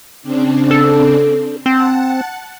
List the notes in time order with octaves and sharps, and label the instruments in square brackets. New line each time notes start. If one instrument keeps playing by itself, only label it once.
[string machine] C#3 C4 D4
[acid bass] A4
[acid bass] C4 [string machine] F#5 A5